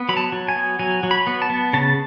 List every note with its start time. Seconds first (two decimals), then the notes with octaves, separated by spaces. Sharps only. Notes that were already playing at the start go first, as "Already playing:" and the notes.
Already playing: B3
0.09 F#3 B5
0.17 A5
0.32 F#3
0.49 G#5
0.56 B3
0.79 F#3 G#5
1.03 F#3
1.11 B5
1.27 B3
1.42 A5
1.50 B3
1.73 C#3 A5